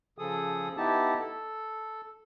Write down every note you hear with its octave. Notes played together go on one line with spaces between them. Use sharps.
C#3 F3 G#4 A4 D#6
B3 D#4 E4 G4 A5
A4